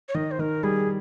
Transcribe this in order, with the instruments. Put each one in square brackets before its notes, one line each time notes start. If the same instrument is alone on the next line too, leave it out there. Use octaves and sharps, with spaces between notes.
[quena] C#5
[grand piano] D#3 [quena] D#5
[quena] C5
[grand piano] D#3 [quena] A#4
[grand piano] G3 [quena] G#4